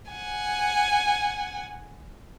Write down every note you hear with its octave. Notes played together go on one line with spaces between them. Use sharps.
F#5 G#5